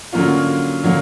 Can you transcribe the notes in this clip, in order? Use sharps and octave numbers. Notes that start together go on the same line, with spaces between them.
D3 F#3 A#3 C#4 F4
D3 F#3 A#3